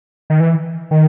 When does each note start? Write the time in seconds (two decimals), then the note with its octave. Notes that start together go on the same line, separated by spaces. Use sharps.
0.30 D#3
0.40 E3
0.91 D#3